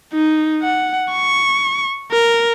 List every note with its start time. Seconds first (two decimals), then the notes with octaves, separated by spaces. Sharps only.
0.13 D#4
0.62 F#5
1.12 C#6
2.11 A#4